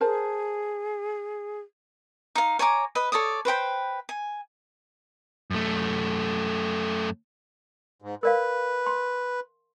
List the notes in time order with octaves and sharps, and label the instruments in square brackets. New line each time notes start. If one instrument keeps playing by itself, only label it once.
[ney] G#4 [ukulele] A#4 C5 A5
[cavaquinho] D#4 F5
C#5 G#5 A#5 D6
B4 D#5 B5
A4 C#5 D5 D#6
B4 C5 G5 B5
G#5
[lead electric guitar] F#2 A3
[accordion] G#2
[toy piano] A#4 D5 F5 [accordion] B4
[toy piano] C6